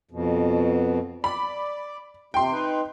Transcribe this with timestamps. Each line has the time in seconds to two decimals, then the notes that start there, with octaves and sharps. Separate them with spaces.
0.11 F2 B2
1.24 D5 B5
2.34 C3 G5 C6
2.53 D#4 B4